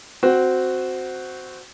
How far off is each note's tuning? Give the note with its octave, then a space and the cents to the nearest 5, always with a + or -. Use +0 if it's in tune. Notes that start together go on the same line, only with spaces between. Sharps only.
C4 -10 F#4 +0